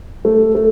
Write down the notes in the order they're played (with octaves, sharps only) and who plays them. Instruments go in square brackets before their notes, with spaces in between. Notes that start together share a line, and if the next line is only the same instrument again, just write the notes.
[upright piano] A3
A3